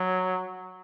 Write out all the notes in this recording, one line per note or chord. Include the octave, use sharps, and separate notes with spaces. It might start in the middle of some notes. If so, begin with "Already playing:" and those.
Already playing: F#3